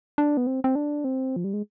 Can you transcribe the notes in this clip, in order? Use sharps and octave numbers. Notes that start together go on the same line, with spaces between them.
D4
B3
C4
C4
D4
C4
F3
G3
G#3